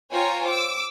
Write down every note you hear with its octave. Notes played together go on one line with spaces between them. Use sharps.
F4 C5 C#5 G5 G#5 A#5
D6 E6